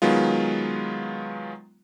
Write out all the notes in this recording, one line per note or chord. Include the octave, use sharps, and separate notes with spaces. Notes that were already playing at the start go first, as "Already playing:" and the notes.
D#3 F#3 G#3 B3 F4